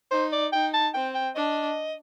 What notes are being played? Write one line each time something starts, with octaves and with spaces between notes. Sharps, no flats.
D#4 C5
D5
D#4 G5
A5
C4 G5
G5
D4 D#5